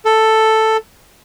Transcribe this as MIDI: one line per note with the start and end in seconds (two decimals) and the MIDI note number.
0.05 0.77 69